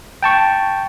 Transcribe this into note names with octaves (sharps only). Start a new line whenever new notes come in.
G5 A5 C#6